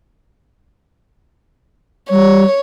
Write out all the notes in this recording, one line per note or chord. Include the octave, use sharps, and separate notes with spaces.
G3 C#5